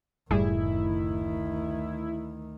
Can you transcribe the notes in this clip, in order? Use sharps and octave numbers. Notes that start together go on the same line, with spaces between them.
F#1 D2 A2 D#3 G3 E4 G#4